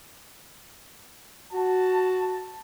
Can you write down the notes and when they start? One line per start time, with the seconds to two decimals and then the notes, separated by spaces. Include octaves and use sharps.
1.52 F#4 A5